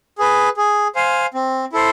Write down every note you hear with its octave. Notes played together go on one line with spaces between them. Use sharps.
G#4 B4
G#4
C5 F5 G#5
C4
E4 A4 C5